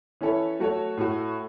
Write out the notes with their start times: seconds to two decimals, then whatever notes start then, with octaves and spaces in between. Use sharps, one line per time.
0.21 E3 C#4 E4 A4 C#5
0.60 F#3 A3 F#4 A4 C#5
0.97 A2 A3 F#4